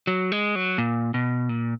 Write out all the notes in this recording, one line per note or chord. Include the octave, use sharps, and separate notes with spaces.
F#3
G#3
F#3
A#2
B2
A#2